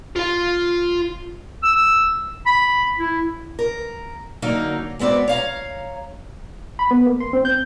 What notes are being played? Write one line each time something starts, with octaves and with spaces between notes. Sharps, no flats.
F4 F5
E6
B5
E4
A#4
D3 F#3 A#3 D#4 A#4
G#3 B3 C4 F#4 D5
C#5 F5 A#5
B5
B3
A#3
C6
C4
G6